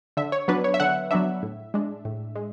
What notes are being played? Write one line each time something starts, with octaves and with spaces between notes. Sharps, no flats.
D3 E5
C#5
F#3 B3 D4 B4
C#5
E5
D3 F#5
F#3 B3 D4 E5
A2
G#3 D4
A2
G#3